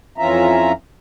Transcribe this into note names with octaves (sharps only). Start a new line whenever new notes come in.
F2 E3 C#4 F4 E5 A#5